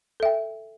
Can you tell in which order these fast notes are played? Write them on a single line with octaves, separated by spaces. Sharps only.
A4 E5 G5